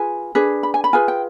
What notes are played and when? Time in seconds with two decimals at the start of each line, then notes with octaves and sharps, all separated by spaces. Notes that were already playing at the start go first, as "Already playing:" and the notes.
Already playing: F4 G#4 B4 G#5
0.35 D4 G#4 B4
0.63 B5
0.74 G#5
0.84 B5
0.93 F4 G#4 B4 G#5
1.08 G5